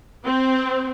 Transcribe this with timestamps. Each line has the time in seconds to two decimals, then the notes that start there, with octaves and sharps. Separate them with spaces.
0.24 C4